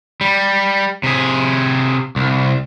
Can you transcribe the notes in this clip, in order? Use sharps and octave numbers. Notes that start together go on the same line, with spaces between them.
G3
C3 G#4
C2